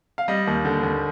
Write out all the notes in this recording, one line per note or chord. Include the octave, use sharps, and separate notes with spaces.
F5
G3 D#5
D#2
D3
D#2